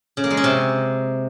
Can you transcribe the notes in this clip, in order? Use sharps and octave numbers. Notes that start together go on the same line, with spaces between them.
C#3
A#3
G#3
C#4
C3